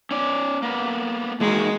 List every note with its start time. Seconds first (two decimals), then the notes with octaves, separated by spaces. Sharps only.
0.11 C#4 D5
0.62 A#3 B3
1.40 E3 G#3 A#3 D#4 F#4